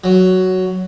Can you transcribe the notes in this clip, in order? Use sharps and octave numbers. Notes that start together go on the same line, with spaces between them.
F#3